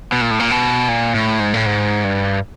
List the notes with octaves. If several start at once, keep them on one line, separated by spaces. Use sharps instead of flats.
B2
A#2
A2
A#2
B2
A#2
A2
G#2
A2
G#2
G2